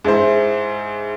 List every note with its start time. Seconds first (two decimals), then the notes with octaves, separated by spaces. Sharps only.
0.05 G#2 E4 C5